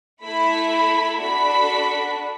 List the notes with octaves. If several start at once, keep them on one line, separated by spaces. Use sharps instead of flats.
A3 E4 A4 B5
D4 F#4 A4 B5